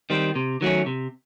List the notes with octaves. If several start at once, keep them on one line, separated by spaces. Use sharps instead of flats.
D#3 G3 C4
C3
D#3 F#3 A3 C#4
C3